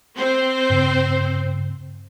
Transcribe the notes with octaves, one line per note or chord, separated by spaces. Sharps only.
C4 C5
G2 C#3